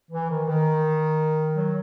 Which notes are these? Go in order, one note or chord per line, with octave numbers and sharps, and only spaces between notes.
E3
D#3
D#3
F#3